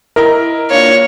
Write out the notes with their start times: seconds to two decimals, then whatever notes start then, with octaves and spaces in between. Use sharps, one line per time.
0.16 E4 A#4 D#5 A#5
0.70 A#3 D4 F4 C#5